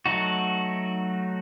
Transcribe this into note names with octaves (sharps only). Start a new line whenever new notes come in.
F#3 A3 D#4 F#4